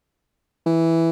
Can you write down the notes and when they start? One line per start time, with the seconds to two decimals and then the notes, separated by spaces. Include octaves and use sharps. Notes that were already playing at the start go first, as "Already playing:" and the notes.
0.66 E3